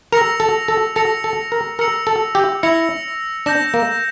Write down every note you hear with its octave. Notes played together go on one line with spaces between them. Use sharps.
A#4 E6 A#6 C#7 F7
A4
A4
A4 E6 A#6 C#7 F7
A4
A#4
A#4 E6 A#6 C#7 F7
A4
G4
E4 E6 A#6 C#7 F7
D4 G6 A#6 E7
A#3